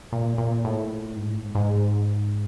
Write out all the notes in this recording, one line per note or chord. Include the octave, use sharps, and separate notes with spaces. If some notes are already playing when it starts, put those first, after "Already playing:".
A#2
A#2
A2
G#2
A2
G#2
G#2